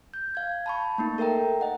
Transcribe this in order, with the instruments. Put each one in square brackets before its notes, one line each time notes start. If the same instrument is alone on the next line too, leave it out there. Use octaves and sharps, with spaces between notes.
[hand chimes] G6
F5 G#6
A5 B5 C#6
A3 A#3 D#4
A4 A#4 E5 G5 A#5
D#5 F#5